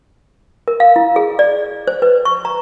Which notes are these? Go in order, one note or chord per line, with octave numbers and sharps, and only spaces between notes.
A#4
F5
E4
G#4
D5
C5
B4
C#6
A#5